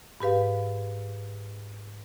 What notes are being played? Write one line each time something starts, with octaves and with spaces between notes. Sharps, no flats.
G#2 G4 B4 F5